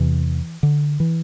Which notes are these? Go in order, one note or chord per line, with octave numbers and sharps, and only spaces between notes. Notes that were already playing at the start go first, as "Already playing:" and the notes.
Already playing: E2 C3 E3
D3
E3